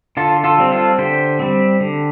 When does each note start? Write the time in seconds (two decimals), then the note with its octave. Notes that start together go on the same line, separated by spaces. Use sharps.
0.17 D3 F4 A4
0.44 F4 A4
0.58 G3 C4
0.72 F4 A4
0.98 D3 G4 C5
1.39 G3 C4
1.80 D3